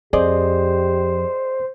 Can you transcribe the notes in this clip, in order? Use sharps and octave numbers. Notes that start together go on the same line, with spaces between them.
F2 G4 G#4 C5 D5 D#5